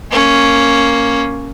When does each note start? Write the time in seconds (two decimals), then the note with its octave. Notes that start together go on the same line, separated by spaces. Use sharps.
0.11 A#3 C#4